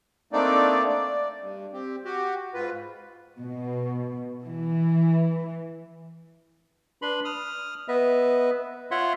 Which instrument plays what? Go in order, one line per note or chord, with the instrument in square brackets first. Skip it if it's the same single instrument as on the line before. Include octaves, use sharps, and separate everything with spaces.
[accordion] A3 A#3 C4 D4 D#4 D5
D5
G2
C4 G4
F#4 G4
G#2 F4 B4
[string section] B2
E3
[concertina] D4 B4 B5 C6
D#6 F6
B3 B4 D#5 E5
F4 C#5 E5 F#5 C6